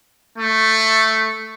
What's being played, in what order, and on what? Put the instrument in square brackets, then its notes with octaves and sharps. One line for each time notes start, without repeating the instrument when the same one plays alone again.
[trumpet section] A3